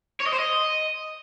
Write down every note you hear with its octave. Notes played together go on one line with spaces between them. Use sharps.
C#5
D#5
C5
D#5